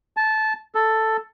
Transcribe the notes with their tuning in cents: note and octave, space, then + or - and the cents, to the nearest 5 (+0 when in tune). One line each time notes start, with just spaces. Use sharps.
A5 -15
A4 +5